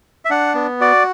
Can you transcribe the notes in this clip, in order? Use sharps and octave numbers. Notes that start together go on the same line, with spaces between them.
E5
D4 F#5
B3
F#4 D5